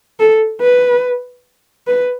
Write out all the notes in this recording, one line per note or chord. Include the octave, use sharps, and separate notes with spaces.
A4
B4
B4